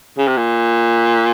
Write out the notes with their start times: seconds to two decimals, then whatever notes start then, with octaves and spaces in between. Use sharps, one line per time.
0.18 C#3
0.27 C3
0.37 A#2